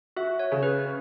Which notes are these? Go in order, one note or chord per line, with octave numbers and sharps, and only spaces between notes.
F#4 E5
C#5
C#3
B4
C#4